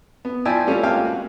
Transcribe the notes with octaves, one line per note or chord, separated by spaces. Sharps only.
B3
F3 E4 D5 E5 G5 G#5
G3 A3 C#4 F4
G#3 A#3 C4 F5 G5
F#4